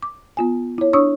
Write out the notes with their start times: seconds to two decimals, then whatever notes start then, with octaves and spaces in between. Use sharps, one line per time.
0.03 D6
0.37 B3 F4 G#5
0.78 E4 C#5
0.93 D4 C#5 C#6 D#6 E6